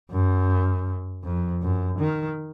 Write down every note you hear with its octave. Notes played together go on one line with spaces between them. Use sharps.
F#2
F2
F#2
D#3